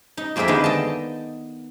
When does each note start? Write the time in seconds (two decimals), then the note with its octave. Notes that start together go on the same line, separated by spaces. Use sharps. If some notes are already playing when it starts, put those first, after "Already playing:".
0.17 D#4
0.36 F2 A#3 C4 G#4 A#4 E5
0.48 D3 D#3 G#3 A#3 B3 D#4
0.64 D#5 G5 A5